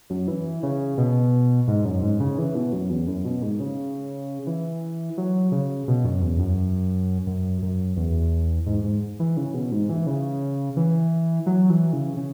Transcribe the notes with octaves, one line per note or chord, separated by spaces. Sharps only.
F#2
E3
C#3
B2
G#2
F#2
G#2
C#3
E3
B2
F#2
E2
F#2
B2
G#2
C#3
E3
F#3
C#3
B2
F#2
E2
F#2
F#2
F#2
E2
G#2
G#2
E3
C#3
B2
G#2
E3
C#3
E3
F#3
E3
C#3
C#3